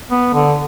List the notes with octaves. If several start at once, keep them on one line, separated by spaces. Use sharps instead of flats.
B3
D3